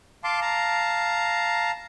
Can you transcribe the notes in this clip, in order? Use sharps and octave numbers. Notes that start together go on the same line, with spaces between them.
F5 A5 C6 D6
F5 A5 A#5